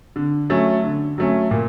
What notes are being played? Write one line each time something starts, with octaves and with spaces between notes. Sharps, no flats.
D3
F#3 A3 C#4
D3
F#3 A3 C#4
A#2